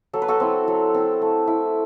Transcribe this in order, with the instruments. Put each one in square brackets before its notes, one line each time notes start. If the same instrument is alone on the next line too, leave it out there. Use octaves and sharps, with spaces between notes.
[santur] F#3 A4
B4
F#4 A4
C4 E4
F#3
C4 E4
A3
E4